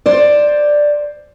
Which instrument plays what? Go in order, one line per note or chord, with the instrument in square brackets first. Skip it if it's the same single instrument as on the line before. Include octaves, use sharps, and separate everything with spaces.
[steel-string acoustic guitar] C5 D5